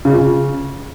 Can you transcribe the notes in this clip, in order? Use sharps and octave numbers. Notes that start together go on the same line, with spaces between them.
C#3
F4
C#3